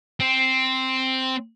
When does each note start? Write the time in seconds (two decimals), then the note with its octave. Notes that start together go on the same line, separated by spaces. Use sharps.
0.20 C4